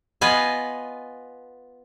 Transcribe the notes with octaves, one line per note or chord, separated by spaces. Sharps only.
B3 F4 B4 D#5 G#5